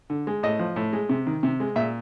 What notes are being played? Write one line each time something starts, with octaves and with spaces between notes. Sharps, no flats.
D3
G#3
A2 D#5
F3
A2
G#3
C3
D#3
C3
G#3
A#2 E5